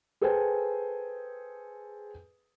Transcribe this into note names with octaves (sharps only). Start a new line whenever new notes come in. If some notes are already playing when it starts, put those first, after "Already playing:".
G#4 A4 B4 C5 G5 G#5